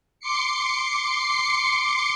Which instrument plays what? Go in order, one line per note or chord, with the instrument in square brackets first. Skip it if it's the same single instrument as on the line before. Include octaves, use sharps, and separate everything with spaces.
[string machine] C6 D6 C7 C#7